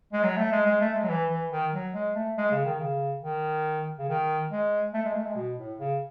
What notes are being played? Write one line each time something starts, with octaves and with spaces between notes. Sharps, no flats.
G#3
F#3
A3
G#3
G#3
A3
G#3
F#3
E3
E3
D#3
F#3
G#3
A3
G#3
C#3
D#3
C#3
D#3
C#3
D#3
G#3
A3
G#3
A3
G#3
B2
A2
C#3